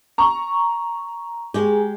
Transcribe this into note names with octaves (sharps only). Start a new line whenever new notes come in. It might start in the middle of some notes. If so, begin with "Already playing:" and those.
A#5 C#6
G#3 G4 G#4